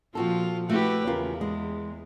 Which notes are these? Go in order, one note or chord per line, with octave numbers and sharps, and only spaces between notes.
A#2 F3 C4 F4 F#4 A4
A3 C4 E4 F#4 G4 B4
E2 C#3 F4 A#4
G#3